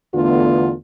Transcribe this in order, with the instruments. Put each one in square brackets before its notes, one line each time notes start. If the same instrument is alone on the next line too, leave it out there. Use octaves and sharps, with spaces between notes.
[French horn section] E2 D3 A3 B3 D4 F4